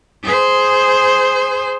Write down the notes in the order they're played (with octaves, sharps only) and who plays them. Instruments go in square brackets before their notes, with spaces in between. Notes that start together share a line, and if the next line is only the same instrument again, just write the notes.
[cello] G#4 C5